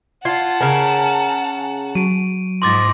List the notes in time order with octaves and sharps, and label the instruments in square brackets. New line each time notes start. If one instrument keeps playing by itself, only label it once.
[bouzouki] F4 [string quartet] F#5 A5 [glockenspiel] G#6
[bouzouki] C#3 A#4 [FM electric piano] G#5
[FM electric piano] F#3 [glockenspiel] D7 D#7
[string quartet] G#2 F3 A#6 [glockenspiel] C6 D6 A6